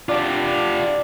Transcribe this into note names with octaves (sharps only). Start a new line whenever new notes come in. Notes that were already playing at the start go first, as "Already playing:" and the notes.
D4 F4 G4